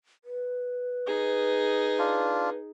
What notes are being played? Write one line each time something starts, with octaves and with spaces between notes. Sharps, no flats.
B4
D#4 G#4
D4 F4